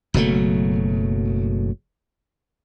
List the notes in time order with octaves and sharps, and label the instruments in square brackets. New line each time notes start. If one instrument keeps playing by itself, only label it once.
[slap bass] F#1 B2 F#3 A3